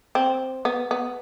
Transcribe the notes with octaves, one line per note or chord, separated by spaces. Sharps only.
C4
B3
B3